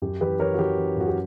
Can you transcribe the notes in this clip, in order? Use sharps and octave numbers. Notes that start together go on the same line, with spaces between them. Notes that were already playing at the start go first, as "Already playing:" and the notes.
F#2 G4
E3 G4 B4
E3 A#4 C#5
F#4
E3 G4
E3
F#2 F#4
G4